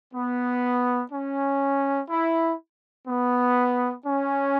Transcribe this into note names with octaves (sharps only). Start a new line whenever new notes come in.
B3
C#4
E4
B3
C#4